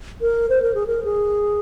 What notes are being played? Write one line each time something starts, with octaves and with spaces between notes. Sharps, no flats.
A#4
C5
A#4
G#4
A#4
G#4